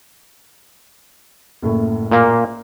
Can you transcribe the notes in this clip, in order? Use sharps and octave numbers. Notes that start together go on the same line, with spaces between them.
F#1 A2
A#2 A#3